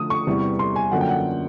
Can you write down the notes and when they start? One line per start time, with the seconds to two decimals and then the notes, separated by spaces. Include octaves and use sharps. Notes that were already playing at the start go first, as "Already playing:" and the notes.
Already playing: D3 F3 A3 D4 F4 D#6
0.10 C#6
0.27 E2 C3 E3 G3
0.59 C6
0.76 G#5
0.92 F#2 D3 F3 A#3 F#5
1.01 G5
1.09 F#5